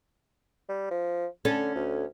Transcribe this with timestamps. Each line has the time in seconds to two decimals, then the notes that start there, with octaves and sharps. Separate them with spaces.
0.69 G3
0.91 F3
1.45 D3 C#4 A4
1.75 D2